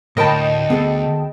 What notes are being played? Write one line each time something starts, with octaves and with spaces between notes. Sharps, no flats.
D2 A2 A#4 D#5 G5 A5 B5
B3 G#4 A4